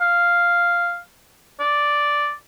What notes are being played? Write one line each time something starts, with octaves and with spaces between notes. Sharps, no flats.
F5
D5